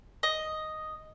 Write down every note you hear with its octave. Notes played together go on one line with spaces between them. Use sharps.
D#5